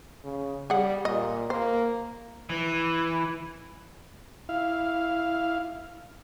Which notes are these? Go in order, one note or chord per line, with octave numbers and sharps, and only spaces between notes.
C#3
G3 G#4 F#5
A#2 D#5
A#3 C5
E3
E4 F5